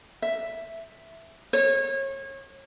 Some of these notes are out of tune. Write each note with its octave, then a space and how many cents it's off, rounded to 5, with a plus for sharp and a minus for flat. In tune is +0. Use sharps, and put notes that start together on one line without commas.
E5 +0
C#5 -30